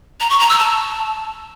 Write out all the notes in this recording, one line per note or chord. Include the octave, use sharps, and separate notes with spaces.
A#5
C#6
A#5
E6
A5